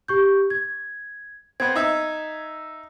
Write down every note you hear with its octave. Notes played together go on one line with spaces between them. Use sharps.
G4 C#6 G6
G#6
B3 C4 G#6
D#4 E5